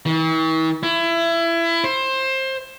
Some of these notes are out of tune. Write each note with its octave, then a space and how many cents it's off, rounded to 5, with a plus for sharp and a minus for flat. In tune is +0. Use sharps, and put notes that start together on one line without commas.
E3 -45
E4 +25
C5 +20